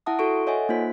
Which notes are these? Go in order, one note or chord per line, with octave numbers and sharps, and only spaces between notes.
E4 E5 F#5 A5 D#6
F#4 A4 C#6 D7
A4 C#5 D#5 E5 F#5 G#5
A#3 D#4 F4 C5 B6